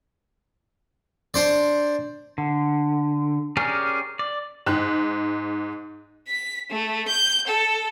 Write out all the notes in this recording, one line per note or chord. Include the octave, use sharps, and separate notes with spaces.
D4 C5 D5
D3
C#4 G4 G#4 A#4 D5
D5
G#2 F#6
B6
A3
G6
A4